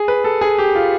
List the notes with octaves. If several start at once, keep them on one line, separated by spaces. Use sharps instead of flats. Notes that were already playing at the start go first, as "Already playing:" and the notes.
Already playing: G#4
B4
A4
G#4
G4
F4